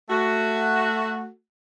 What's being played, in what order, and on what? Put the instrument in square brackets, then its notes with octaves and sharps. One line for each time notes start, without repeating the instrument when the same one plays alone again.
[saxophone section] A3 F#4